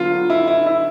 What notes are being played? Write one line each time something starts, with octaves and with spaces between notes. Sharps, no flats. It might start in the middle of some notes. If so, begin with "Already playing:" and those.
Already playing: D3 F#3 B3 F4
E4
E4
E4